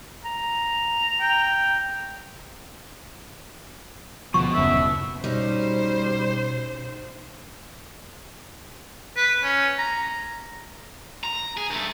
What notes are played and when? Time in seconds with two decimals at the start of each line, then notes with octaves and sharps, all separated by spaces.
0.25 A#5
1.21 G5
4.34 D2 B2 F3 C#6
4.54 D#1 F#2 C#3 E5
5.24 B2 G3 C#4 D#4 C5
9.16 B4
9.44 C#4
9.78 A#5
11.24 A#5
11.57 G#4
11.70 G2 A3